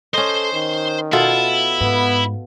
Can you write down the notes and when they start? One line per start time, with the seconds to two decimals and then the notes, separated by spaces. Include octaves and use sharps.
0.14 C#4 A4 C5 D#5 C6
0.53 D#3
1.13 B2 E4 F4 A4
1.81 G#2 B3